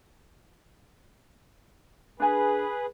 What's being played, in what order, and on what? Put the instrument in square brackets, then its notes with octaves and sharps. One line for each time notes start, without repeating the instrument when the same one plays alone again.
[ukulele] D4 G#5 [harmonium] G#4 B4